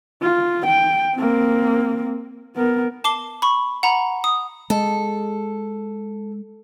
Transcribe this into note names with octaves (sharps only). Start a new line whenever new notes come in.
F4
G5
A#3 C4
B3 A#4
A5 D6 C7 G7
B5 C#6
F#5 A#5 B5
D#6
G#3 A4